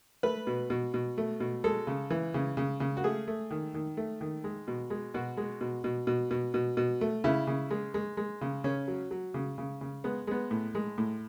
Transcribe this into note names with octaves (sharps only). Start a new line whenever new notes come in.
A3 B4
B2
B2
B2
A3
B2
G#3 A4
C#3
E3
C#3
C#3
C#3
F#4
A3 G#4
A3
D#3
D#3
A3
D#3
G#3
B2
G#3
B2 F#4
G#3
B2
B2
B2
B2
B2
B2
A3
C#3 E4
C#3
G#3
G#3
G#3
C#3
C#3 C#4
F#3
F#3
C#3
C#3
C#3
G#3 B3
G#3 B3
A2
G#3
A2